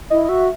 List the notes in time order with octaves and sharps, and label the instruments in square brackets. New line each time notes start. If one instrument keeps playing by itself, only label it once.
[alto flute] E4 [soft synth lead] D#5
[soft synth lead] D#5
[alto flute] F#4 [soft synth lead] E5